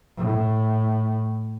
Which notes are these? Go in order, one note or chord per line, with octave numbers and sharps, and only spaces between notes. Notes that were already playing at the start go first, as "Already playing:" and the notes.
A2